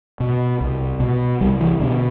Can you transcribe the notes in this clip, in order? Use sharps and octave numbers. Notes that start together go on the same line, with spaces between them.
B2
C2
B2
C2 G3
E3
B2 D3